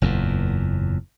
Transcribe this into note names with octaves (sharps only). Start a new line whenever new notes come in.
F#1 E2 A#2